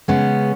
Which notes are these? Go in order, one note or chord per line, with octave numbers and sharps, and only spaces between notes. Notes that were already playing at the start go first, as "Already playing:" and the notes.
C#3 G#3 B3 C#4